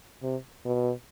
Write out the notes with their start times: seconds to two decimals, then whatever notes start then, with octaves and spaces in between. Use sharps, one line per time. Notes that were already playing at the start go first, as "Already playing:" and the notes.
0.23 C3
0.66 B2